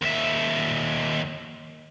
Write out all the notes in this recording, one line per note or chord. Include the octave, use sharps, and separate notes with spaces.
D#2 E5